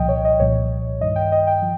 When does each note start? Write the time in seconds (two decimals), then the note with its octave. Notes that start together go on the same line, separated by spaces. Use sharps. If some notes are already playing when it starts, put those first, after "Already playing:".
Already playing: C2 A#2 F3 D#5 G5
0.09 C#5
0.25 D#5
0.40 C2 A#2 F3 C#5
1.00 G2 D#3 D#5
1.16 G5
1.32 D#5
1.47 G5
1.62 F3